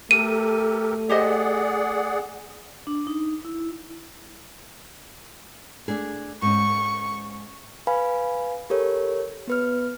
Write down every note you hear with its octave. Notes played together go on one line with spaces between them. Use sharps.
A3 G4 A4 A#4 D#7
G4 G#4 C5 D5 D#5 F#5
D4
D#4
E4
A3 D4 G#4
G#2 C#4 C#6
B4 F5 G#5 B5
G4 A4 A#4 C#5
B3 B4 F6